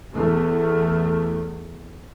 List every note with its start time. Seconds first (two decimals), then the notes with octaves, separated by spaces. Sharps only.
0.13 E2 A3